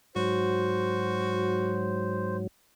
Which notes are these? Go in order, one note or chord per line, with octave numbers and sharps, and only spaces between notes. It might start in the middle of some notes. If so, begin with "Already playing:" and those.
G#2 F#3 F#4 C5